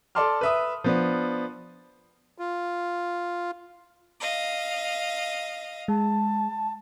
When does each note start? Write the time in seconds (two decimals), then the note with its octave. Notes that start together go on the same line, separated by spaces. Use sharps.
0.15 A4 D5 A5 C6 D6 F6
0.41 B4 E5 D#6
0.84 F3 B3 D4
2.38 F4
4.20 D#5 F5
5.88 G#3 A5